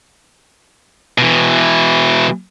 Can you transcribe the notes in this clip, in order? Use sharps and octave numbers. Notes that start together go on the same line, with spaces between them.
B2 E3